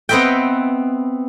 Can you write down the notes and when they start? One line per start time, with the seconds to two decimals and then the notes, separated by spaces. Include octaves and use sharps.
0.09 B3 C4 B4 D#5 E5 G5